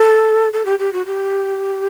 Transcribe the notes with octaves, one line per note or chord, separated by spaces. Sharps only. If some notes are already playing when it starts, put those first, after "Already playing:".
Already playing: A4
A4
G4
G4
F#4
G4